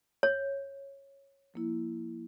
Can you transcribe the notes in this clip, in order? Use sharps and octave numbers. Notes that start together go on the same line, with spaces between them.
C#5
F3 A#3 E4